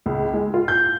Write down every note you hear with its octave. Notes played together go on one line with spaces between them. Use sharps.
C#2
G#3
F4
G6